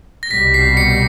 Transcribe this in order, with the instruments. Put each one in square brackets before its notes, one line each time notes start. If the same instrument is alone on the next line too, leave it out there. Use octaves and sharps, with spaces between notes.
[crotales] A#6
[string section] C2 B2 G3 [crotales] B6
[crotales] C7
C#7